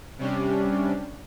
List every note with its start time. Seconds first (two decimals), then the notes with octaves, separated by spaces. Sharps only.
0.18 C3 G3 C#4 D4